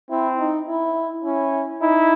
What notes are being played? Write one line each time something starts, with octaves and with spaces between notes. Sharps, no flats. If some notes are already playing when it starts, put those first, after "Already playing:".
C4 E4
D#4
E4
C#4 E4
D#4 E4